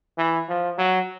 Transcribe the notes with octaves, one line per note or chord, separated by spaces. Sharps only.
E3
F3
F#3